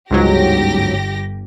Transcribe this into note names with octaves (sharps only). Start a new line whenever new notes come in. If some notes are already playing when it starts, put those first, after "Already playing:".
G1 C#2 G#2 F#3 G4 A#6